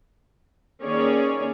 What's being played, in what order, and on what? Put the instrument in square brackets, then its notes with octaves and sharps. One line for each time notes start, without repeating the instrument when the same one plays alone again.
[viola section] D#3 A#3 C#4 G#4 C#5 D5